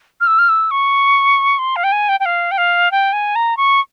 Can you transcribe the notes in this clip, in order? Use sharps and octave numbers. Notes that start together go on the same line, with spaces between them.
F6
E6
F6
E6
C#6
C6
F5
G5
G#5
G5
G5
F5
G5
F5
G5
G#5
A#5
C#6